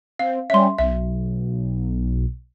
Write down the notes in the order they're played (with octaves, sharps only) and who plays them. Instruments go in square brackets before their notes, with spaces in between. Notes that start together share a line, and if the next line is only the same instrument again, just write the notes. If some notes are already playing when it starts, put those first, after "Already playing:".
[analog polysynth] C4 [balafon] F5
[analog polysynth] G3 C#4 [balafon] E5 C6
[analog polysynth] B1 [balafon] E5